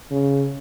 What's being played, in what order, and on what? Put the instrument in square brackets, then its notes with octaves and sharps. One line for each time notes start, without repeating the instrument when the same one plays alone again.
[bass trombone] C#3